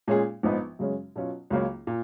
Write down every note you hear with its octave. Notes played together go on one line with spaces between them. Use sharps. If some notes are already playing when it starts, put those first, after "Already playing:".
A#2 G#3 C#4 G#4
A#1 G#2 F3 B3 D#4
F#2 C#3 G#3 C#4
B2 F#3 C#4 F4
C#2 C#3 F#3 A#3 C#4
A#2